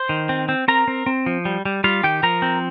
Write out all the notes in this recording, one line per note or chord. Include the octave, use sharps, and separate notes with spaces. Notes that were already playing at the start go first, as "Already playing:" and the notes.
Already playing: C5 C6
D#3
C4
C4
C4 A#4 A#5
C4
C4
F3
G3
G3
G3 F4 F5
D#3 G4 G5
F3 A#4 A#5
C4